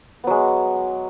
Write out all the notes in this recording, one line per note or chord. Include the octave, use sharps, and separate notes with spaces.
F#3 G#3 B3